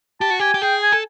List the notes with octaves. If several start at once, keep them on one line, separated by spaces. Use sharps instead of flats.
G4 A5
F#4
G4 G#5
G4
G#4 G5
G#5
A4